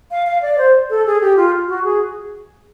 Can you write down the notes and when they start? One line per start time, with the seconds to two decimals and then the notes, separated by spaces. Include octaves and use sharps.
0.11 F5
0.27 F5
0.42 D5
0.58 C5
0.90 A4
1.06 G#4
1.21 G4
1.37 F4
1.68 F#4
1.84 G#4